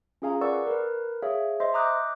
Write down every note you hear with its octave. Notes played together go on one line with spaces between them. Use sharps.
C#4 F4 G#4 F5 G#5 A#5
A#4 B4 D5 F#5 C#6 E6
A#4 B4
G#4 C#5 E5 F5
C5 D#5 E5 C6
A#5 D6 D#6 F#6 G6